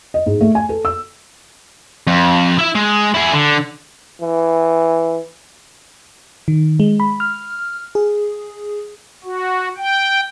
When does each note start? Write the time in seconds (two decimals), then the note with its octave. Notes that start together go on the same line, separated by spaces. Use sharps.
0.14 D#5
0.26 G#2
0.41 A3
0.55 G#5
0.69 A4
0.85 E6
2.07 F2
2.58 E4 E5
2.75 G#3
3.14 E4 G#4
3.33 D3
4.21 E3
6.48 D#3
6.80 G#3
7.00 B5
7.20 F6
7.95 G#4
9.24 F#4
9.77 G5